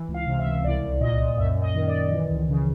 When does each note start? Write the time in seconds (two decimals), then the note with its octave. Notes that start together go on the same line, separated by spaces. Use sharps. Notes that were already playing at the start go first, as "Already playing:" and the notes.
Already playing: E3
0.08 C#2
0.14 F5
0.26 C3
0.39 E5
0.46 C#2
0.64 C2 D5
0.83 C2
1.01 A#2 D#5
1.19 A#2
1.38 F#2 E5
1.56 F#2
1.62 D#5
1.75 D#3
1.87 D5
1.93 D#3
2.12 E3
2.31 C#2
2.49 C#3